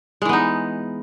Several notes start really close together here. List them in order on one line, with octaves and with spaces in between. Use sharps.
G#3 E3 B3 D#4